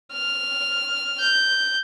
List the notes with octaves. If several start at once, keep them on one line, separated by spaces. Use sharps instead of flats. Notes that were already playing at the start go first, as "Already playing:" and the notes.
F6
G6